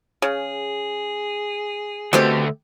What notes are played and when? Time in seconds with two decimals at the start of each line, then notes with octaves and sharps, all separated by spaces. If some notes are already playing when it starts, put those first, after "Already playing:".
0.22 C#3 G#4
2.13 D2 B2 A3 C4 G4